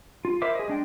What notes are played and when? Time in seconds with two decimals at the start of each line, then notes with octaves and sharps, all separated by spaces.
0.25 F4
0.42 E4 A#4 C5 E5 D6
0.55 G#4 D#5
0.68 G#3 D4 G5